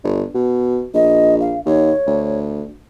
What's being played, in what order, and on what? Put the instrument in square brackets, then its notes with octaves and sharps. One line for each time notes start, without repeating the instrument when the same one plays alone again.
[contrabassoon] G1
B2
[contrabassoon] A#1 [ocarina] D#5
[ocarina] F5
[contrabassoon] D#2 [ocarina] C#5
[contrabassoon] D2